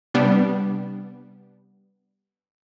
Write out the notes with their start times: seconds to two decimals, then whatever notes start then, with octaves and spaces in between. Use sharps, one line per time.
0.14 C3 G3 B3 D4